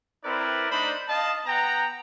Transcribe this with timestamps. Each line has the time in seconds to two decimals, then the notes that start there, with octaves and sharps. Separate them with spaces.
0.24 C4 E4 A#4 B4 D5
0.71 A3 D4 D#4 C5 B5
1.08 D#5 F5 A5
1.46 B3 F#5 G5 A#5